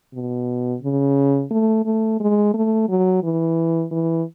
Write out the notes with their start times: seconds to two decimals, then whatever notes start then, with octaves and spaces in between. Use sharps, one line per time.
0.13 B2
0.82 C#3
1.51 A3
1.85 A3
2.20 G#3
2.54 A3
2.89 F#3
3.23 E3
3.92 E3